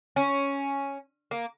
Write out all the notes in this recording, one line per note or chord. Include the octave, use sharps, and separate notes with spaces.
C#4
A#3